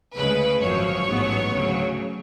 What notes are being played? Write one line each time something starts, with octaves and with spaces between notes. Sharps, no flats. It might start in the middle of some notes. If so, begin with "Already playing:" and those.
D2 C#3 G#3 B4
G#1 F#2 F3 C#5
A1 G#2 F#3 B3
D2 C#3 F#3